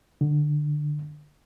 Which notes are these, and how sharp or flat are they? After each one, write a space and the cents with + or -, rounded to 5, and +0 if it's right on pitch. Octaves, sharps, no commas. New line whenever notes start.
D3 +15